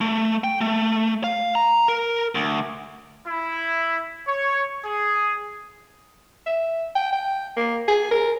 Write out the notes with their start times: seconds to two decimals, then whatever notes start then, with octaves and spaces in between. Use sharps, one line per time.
0.01 A3
0.44 G5
0.61 A3
1.24 F5
1.55 A#5
1.88 A#4
2.35 D2
3.27 E4
4.27 C#5
4.85 G#4
6.46 E5
6.96 G5
7.12 G5
7.57 A#3
7.88 G#4
8.11 A#4